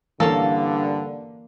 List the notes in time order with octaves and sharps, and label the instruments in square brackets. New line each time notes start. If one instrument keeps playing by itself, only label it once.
[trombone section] G2 D3 [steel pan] E3 [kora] A#3 [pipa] C#4 A4